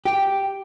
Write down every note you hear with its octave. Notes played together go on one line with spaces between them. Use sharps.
G4